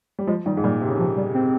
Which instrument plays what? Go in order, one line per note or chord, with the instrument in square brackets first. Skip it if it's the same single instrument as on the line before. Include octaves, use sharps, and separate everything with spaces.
[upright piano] G3
[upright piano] F3 [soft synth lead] G#3
[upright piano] D#3 [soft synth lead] G3
[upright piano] G#2
[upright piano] A#2 [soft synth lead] G3
[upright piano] C3
C#3
[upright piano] C3 [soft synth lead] F3
[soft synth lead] G3
C4